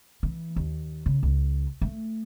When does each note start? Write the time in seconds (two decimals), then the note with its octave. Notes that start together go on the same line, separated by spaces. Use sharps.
0.23 E3
0.56 D#2
1.06 C#3
1.23 C#2
1.82 A3